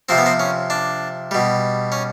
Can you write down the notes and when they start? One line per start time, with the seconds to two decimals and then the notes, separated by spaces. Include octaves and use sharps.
0.09 C3 F3 C4
0.18 B3
0.26 C4
0.40 C#4
0.70 D4
1.31 B2 G3
1.92 C#4